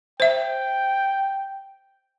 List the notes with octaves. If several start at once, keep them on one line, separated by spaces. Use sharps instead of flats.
C5 E5 G5